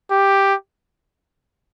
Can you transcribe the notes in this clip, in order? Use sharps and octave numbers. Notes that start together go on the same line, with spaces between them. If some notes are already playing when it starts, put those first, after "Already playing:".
G4